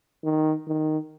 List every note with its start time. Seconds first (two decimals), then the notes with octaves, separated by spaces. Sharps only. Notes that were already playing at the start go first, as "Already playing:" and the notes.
0.24 D#3
0.67 D#3